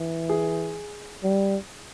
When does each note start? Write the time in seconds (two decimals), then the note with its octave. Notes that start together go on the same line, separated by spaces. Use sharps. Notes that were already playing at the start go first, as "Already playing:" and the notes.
Already playing: E3
0.29 G#4
1.23 G3